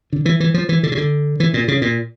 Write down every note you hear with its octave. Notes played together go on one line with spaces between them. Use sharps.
D3
E3
E3
F3
E3
D3
C#3
D3
E3
A#2
C#3
A#2